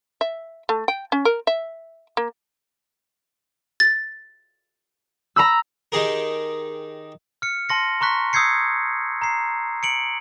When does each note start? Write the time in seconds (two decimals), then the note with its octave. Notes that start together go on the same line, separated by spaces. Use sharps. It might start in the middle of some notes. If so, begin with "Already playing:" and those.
0.21 E5
0.69 A3
0.88 G5
1.12 C#4
1.25 A#4
1.47 E5
2.17 A#3
3.80 A6
5.36 A#5 B5 E6
5.92 D#3 D#4 G4 G#4 A#4
7.42 F6 C#7
7.69 A5 C6 A#6 C#7
8.01 A#5 C6 C#6 F#6 B6
8.33 D#6 E6 G6 G#6 C7 C#7
9.22 A#5 C7
9.83 C#7 D7 F#7